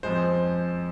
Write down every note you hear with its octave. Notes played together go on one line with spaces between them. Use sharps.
F2 F3 G#3 C5